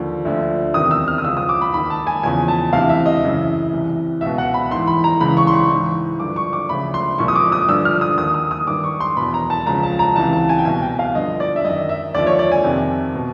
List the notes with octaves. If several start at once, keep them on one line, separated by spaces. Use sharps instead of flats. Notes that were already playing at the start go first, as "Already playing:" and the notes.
Already playing: D#2 D3 F3
D2 D3 F3
E2 C3 D#3 D#6
E6
F6
D#6
C#2 C#3 F3 E6
D#6
D6
B5
D#2 D#3 B5
A5
G#5
E2 C#3 F3 G#5
A5
D2 C3 E3 F5
E5
D#5
F#2 C#3 E3
C2 C3 E3
C#2 B2 E5
F#5
B5
G#2 E3 C6
B5
A#5
C#2 C#3 E3 B5
C#6
C6
C#6
G#2 E3
G2 D3 F3 D6
C#6
D6
D2 C#3 F3 B5
C6
C2 A#2 F3 C#6
D#6
D6
D#6
G2 D3 F3 E6
F6
D#6
D#2 D#3 D#6
D#6
D#6
G2 D#3 D6
C#6
C6
E2 B2 B5
A#5
A5
C#2 C#3 F3 A#5
A5
A#5
C#2 C3 E3 A5
A5
G#5
G5
C2 B2 G#5
G5
F5
G2 D3 F3 D#5
D5
E5
F#2 D#3 D#5
E5
D#2 D3 F3 D5
C#5
D5
G#5
F2 C3 D#3
B2